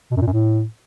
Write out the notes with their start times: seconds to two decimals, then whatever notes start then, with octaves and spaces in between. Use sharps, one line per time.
0.11 B2
0.16 F#2
0.21 A#2
0.27 F#2
0.32 A2